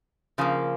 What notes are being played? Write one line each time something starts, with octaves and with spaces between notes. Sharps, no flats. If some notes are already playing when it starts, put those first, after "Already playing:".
C#3 F3 A#3